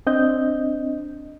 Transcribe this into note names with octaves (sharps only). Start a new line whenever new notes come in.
C4 D4 D#5 G6